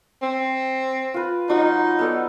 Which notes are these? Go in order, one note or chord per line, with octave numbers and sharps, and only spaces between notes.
C4
F4 B4
F#3 D#4 F4 F#5
B3 A4 D5